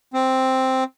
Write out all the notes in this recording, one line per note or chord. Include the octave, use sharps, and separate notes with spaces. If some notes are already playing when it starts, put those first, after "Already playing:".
C4